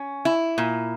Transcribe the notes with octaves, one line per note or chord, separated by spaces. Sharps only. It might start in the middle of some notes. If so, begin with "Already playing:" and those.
Already playing: C#4
E4
A#2